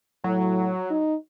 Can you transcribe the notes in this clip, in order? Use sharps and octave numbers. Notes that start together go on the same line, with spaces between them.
A2 F#3
D#4